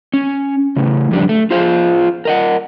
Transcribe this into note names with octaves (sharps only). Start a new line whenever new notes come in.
C#4
A2 C#3
F2 G3 D4
A3
F4 G#4 C5 F5
A#4 D#5 F#5